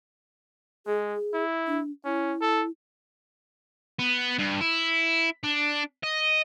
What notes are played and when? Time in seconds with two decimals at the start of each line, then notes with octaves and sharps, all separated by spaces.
0.87 G#3 G#4
1.34 E4
1.68 D4
2.05 C#4 E4
2.41 A4
3.99 B3
4.39 G2
4.61 E4
5.44 D4
6.04 D#5